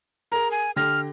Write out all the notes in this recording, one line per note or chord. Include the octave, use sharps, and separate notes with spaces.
G#4 A#4 A#5
G#5
D3 G4 F6 A#6